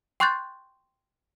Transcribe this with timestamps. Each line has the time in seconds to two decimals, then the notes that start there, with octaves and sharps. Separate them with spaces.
0.20 G5 C6 C#6 F#6 G6 A6